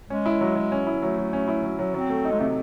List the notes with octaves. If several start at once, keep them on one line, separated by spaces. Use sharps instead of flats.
G#3 C#4
E4
F#3
F#3
C#4
E4
F#3 A3
F#3
C#4
E4
F#3
F#3
F#3 C4
A3
D#4
G#3
C3 A3